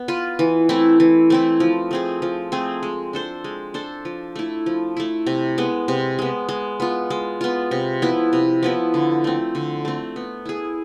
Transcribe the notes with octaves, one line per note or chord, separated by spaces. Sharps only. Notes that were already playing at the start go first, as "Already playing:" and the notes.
Already playing: B3
F4 B4
E3
A3 C4 E4
E3
A3 C4 E4
F3
A3 C4 G#4
F3
A3 C4 G#4
G#3
D4 A4 C5
G#3
D4 A4 C5
F3
A3 E4
F3
A3 E4
C3
G#3 B3
C3
G#3 B3
G#3
B3 F4
G#3
B3 F4
C3
F3 B3 E4
C3
F3 B3 E4
D3
A3 C4
D3
A3 C4
B3
E4 G#4